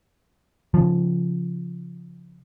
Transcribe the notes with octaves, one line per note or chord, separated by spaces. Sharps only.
C#3 F3